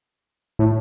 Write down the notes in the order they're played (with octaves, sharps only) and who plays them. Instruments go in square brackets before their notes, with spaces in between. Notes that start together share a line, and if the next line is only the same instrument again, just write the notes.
[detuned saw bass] A2